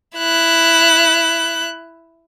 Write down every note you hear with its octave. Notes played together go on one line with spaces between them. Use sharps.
E4 F#6